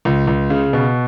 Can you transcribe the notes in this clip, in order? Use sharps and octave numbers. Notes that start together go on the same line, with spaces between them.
C#2
C#2
C#3
B2